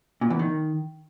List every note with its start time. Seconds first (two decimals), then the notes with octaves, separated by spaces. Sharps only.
0.21 A#2
0.30 E2
0.39 D#3